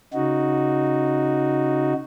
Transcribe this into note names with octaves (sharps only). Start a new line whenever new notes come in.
C#3 D#4 F#4